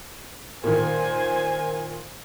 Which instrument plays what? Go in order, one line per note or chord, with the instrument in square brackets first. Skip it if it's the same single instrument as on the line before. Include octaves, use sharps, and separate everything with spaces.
[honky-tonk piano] A#2 D#3 [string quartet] C5 G#5